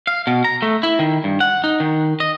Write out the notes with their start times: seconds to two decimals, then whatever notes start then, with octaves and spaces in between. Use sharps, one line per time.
0.07 F5
0.27 B2
0.45 A#5
0.62 A3
0.83 E4
0.99 D#3
1.24 G2
1.40 F#5
1.64 D#4
1.80 D#3
2.20 D#5